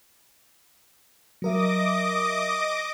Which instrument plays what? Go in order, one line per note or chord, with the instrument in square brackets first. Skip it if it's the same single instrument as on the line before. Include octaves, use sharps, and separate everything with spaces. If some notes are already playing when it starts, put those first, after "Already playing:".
[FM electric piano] F#3 A#4 E5 [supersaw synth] D#5 D6 D#6